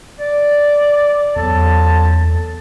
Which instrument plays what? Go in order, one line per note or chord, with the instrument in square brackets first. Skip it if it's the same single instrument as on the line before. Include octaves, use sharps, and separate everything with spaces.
[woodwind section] D5
[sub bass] E2 [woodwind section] F#3 A4 A5